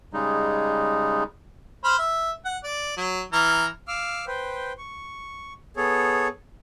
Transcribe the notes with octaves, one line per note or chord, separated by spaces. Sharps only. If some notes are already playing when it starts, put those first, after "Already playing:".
C#3 G3 G#3 D#4
C5 B5 F6
E5
F#5
D5
F#3
E3 A#5 F6
F5 D6 E6 F6
B4 C5 G5
C#6
B3 G#4 A4 C#5